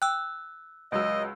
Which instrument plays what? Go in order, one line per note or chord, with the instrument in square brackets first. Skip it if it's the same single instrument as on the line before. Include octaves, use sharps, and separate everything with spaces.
[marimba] G5 [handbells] E6 F#6
[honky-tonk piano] C#2 F#3 E6 [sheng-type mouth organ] D#5